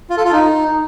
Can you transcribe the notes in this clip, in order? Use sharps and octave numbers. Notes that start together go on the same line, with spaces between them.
F4
A4
F4
D#4